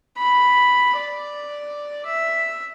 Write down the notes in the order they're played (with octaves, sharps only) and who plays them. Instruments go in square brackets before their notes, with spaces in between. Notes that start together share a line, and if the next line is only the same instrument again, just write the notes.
[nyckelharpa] B5
D5
E5